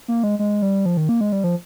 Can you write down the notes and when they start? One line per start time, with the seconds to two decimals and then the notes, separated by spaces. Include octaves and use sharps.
0.08 A#3
0.23 G#3
0.39 G#3
0.62 G3
0.86 F3
0.97 D#3
1.09 A#3
1.21 G#3
1.32 G3
1.44 F3